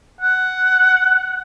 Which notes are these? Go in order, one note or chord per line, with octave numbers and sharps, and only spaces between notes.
F#5